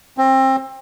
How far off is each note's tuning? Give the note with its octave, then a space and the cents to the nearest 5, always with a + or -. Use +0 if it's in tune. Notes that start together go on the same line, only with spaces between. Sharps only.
C4 +25